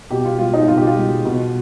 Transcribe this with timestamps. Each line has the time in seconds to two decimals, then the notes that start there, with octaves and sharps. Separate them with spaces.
0.10 B2 G4
0.25 F4
0.39 G#3 F4
0.54 D#4
0.68 B2 F4
0.77 G4
0.87 F4
0.97 G#3
1.25 B2